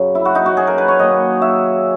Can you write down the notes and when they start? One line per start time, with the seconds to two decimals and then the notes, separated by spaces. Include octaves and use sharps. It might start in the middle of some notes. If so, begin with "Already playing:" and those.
Already playing: F#2 C#3 F#3
0.15 E4
0.25 F#4
0.35 D#4
0.46 F#4
0.57 G#4
0.67 A#4
0.78 B4
0.88 C#5
0.99 D#3 F#3 A#3 D#5
1.42 E5